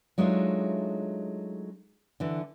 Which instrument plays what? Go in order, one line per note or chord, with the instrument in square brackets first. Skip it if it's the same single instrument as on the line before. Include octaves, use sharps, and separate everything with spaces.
[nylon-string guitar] F#3 G#3 A3 D4 D#4 F4
D3 E3